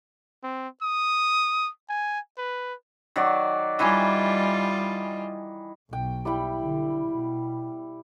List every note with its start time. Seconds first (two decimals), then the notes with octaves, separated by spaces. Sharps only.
0.43 C4
0.82 D#6
1.89 G#5
2.38 B4
3.16 D#3 F#3 D5
3.79 D#3 E3 G3 F4 G#5
5.93 B1 G5
6.25 G3 E4 G5
6.58 D3
7.05 B2